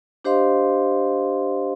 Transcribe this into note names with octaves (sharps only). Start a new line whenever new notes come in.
D4 G4 C5 D#5 F5 C6